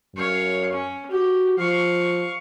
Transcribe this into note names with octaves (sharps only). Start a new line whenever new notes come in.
F#2 C#5 F5
C#4
F#4 G4
F3 F5 C#6